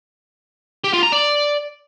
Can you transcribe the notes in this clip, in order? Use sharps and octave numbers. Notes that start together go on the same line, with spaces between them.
G4
F4
A#5
D5